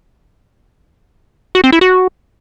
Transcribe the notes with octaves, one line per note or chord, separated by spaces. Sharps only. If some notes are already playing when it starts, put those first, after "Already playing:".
F#4
C4
E4
F#4